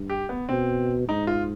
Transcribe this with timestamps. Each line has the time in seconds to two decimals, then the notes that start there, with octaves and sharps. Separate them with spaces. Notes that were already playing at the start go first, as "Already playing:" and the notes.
Already playing: G2
0.10 G4
0.29 B3
0.49 B2 C4
1.08 G#2 D#4
1.27 F4